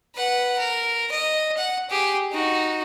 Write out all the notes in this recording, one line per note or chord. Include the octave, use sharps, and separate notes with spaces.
B4 F#5
A#4
D#5
F#5
G4 G#4
D#4 F#4